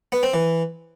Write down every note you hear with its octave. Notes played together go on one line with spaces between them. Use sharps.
B3
C4
E3